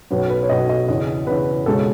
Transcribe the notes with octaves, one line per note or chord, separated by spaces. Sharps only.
B1 B2 F#3 C#4 B4
B4
C#5
B1 B2 F#3 C#4 D#5
D#5
E2 C#3 E3 D#5
E2 C#3 E3 B4
C#2 B2 G#3 C#4 A4